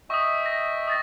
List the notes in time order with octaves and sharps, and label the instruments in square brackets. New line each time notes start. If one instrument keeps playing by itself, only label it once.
[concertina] D#5 E5 G5 [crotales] C#6 D#6
[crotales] A#6
D#6 A6 A#6